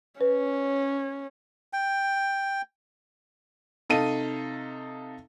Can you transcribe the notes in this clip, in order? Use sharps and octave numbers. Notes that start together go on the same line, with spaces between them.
C#4 B4
G5
C3 D#4 A4 F5 D#7